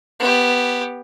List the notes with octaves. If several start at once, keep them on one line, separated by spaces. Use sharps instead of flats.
B3 G4